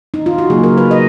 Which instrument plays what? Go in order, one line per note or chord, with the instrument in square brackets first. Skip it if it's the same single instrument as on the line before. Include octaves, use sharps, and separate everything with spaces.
[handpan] D#4
F4
F#4
C#3 F#3 A#3 G#4
A#4
B4
D#5